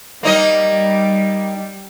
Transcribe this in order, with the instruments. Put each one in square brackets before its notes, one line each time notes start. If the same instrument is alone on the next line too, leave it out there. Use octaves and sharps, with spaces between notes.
[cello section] G3 [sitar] A#3 D#4 D#5